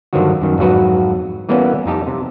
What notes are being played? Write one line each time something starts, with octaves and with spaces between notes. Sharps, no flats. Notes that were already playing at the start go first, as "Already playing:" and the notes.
G2 D3 D#3 F3 F#3 F#4
F#2 D#3
F2 G#2 F#3 F#4 B4
E3 G3 A#3 B3 C#4
F2 D#4 G4 A5
C3